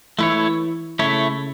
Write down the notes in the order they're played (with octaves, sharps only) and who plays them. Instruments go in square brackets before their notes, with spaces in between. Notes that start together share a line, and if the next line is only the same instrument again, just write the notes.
[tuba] E3 [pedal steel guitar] A3 E4 C#5
[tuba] C#3 [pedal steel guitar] A3 E4 C#5